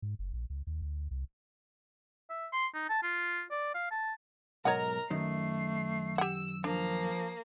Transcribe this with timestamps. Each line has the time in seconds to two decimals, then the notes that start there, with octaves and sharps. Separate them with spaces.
0.02 G#2
0.19 F#1
0.33 A#1
0.50 C#2
0.67 D#2
0.82 D2
1.11 C2
2.30 E5
2.52 C6
2.74 D#4
2.89 A5
3.03 F4
3.51 D5
3.75 F5
3.91 A5
4.65 B1 G#2 A#4 C#5 D#5 F#5 A#5
5.10 F#2 D#3 A3 C7
6.18 G4 F#5 E6
6.64 F3 A#3 D4